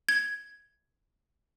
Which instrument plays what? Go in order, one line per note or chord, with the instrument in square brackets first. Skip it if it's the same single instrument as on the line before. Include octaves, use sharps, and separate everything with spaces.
[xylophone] G#6